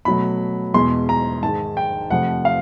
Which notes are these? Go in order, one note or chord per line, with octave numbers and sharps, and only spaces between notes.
B2 F#3 A3 B5
E2 B2 G#3 C6
A#5
G#2 D#3 G#3 A5
G5
F2 C3 F3 A3 F#5
F5